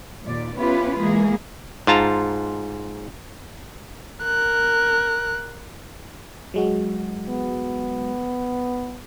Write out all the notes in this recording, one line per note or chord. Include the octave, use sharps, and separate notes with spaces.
D#2 A#2 D5
B3 C#4 E4 F4 G4 B4
E3 G#3 A#3 G#4
G#2 F4 A5 A#5
A#4 F#6
F#3 G#3 F#4
B3